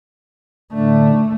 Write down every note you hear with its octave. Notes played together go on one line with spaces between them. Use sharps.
A2 D3 A3 D4